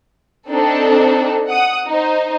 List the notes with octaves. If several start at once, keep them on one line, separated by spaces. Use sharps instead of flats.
C4 D4 D#4 A4
F#5 D#6
D#4 C5